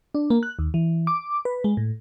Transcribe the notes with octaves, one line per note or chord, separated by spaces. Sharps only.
D4
A#3
F#6
D#2
E3
D6
B4
G#3
A2